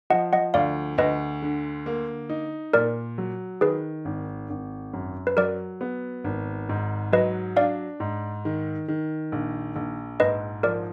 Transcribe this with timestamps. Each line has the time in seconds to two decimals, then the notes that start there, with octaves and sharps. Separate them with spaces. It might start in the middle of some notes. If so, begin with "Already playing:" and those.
0.10 F3 D#5 F#5
0.33 D#5 F#5
0.54 D2 D5 F5
0.98 D2 B4 D#5
1.42 D3
1.86 A#3
2.30 D#4
2.73 A#2 A#4 D5
3.18 F#3
3.61 D#3 G#4 B4
4.05 G#1
4.50 G#1
4.93 F#2
5.27 B4
5.37 F#3 A#4 D5
5.81 B3
6.24 G#1
6.69 G#2
7.12 F#3 B4 D#5
7.56 D4 D5 F5
8.00 G#2
8.45 D#3
8.88 D#3
9.32 A#1
9.76 A#1
10.20 G#2 B4 D#5
10.63 F3 A#4 D5